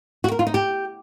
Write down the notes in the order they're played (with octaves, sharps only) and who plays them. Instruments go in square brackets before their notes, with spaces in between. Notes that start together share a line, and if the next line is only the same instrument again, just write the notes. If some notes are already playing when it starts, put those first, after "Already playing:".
[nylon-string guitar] F#4
A#4
F4
D#4
G4